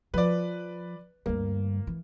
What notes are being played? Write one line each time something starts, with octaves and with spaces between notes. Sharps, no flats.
F3 B4 D5
D2 G2 A#3
E3